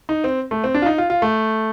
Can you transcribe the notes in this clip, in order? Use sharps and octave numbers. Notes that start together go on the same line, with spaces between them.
D#4
C4
A3
C4
D4
F4
D#4
F4
F4
A3